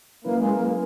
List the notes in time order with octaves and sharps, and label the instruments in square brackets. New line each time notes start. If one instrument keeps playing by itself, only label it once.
[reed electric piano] F#3 C#4 E4 B4 [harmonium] A#3
[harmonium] G#3
A#3